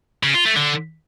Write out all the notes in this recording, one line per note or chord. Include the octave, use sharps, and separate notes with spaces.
C#3
F4
A3
D3